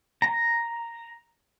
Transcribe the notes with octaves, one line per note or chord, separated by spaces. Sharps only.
A#5